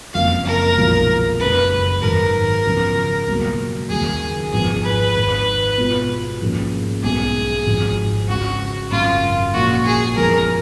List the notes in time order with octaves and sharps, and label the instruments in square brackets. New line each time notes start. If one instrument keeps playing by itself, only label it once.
[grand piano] F#1 F2 C#3 F3 A#3 [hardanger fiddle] F5
[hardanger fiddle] A#4
[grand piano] B1 A#2 F3 G#3
[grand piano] F#1 F#2 C#3 G#3 [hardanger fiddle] B4
[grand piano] G#2 D#3 F#3 [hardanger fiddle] A#4
[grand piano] C#2 C#3 F3 G#3 B3
C#2 B2 F#3 A#3
[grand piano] D#2 C#3 F#3 A#3 [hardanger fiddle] G#4
[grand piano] G#1 G#2 F3 B3 [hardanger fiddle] G#4
[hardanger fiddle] B4
[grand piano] G#1 G#2 D#3
B2 G#3 B3 F4
G#2 F3 A#3 C#4 G#4
[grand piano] B1 B2 G#3 [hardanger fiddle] G#4
[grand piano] G#1 G#2 F3
[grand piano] C#2 C#3 G#3 [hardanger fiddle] F#4
[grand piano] G#1 F#2 C#3 [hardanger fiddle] F4
[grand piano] A#1 A#2 G#3 [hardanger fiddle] F#4
[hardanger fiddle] G#4
[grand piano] F#2 F3 G#3 B3 [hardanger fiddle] A#4